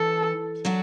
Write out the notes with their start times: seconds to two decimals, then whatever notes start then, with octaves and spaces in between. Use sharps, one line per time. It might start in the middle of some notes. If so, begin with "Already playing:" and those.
Already playing: E3 A4
0.65 F#3 D4 F#4